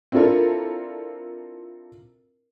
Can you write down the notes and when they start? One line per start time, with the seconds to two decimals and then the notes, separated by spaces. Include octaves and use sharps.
0.12 C4 D4 E4 F4 A4 A#4